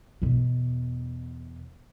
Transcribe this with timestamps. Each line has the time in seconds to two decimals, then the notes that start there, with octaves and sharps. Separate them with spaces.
0.22 E2 B2